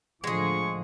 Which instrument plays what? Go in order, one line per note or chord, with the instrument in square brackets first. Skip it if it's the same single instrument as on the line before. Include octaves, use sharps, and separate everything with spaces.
[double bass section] A2 D3 F3 [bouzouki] G#3 G#4 [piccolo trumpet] C#6